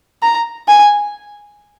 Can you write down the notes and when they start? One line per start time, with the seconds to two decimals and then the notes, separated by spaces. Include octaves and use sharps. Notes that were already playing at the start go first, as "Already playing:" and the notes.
0.22 A#5
0.68 G#5